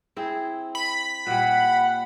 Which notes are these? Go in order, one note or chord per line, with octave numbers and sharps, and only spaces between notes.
C4 E4 G#4
B5
A#2 G3 F#5